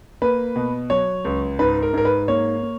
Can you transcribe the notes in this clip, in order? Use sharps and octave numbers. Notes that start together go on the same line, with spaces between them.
A#3 B4
B2
F#3 C#5
C#2
G#2 B4
A#4
G#2 A#4
B4
A#3 C#5
A#3